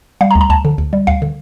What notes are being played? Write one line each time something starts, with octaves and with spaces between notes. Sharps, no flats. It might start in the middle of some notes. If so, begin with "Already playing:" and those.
G3 F5
A#5
D2
A#5
D2 A5
D3
D2
G3
D2 F5
D3